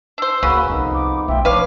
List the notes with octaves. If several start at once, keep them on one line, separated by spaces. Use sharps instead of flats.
D4 C5 E6
C#2 C#3 A#3 F#4 B4
C2 F2 B3 D#4 A#4
D6
B1 A3 F4 E5 G5
F3 C4 D4 B4 C#5 F5 D6